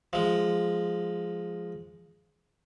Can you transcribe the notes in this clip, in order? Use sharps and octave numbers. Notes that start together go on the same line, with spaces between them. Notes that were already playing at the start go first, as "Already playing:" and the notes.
F3 G#3